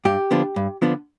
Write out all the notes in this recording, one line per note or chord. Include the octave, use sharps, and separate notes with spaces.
G2 G4
D3 F3 B3 D4
G2
D3 F3 B3 D4